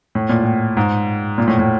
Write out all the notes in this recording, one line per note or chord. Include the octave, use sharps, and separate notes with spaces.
A2
A#2
A2
G#2
A#2
A2
A2